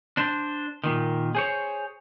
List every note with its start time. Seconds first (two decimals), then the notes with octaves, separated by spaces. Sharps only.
0.17 D4 C5
0.84 A#2 D#3
1.35 G#4 C5 C#5